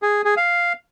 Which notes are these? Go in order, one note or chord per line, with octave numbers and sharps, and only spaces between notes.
G#4
G#4
F5